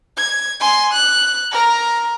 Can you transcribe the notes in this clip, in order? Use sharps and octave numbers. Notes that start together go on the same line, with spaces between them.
G#6
G#5 C6
F#6
A#4 A#5